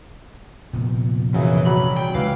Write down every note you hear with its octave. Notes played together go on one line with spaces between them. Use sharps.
F1 A#2 B3
F#2 C#3 E3
F#3 G3 B5
G5
C#2 D3 E3 F5